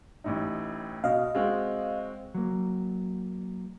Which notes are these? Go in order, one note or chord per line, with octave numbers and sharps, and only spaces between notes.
A1 A2 D#4
B2 D#5 F5
G#3 C4 F#4
F#3 A#3